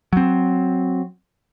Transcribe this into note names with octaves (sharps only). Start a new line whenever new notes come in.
F#3 C4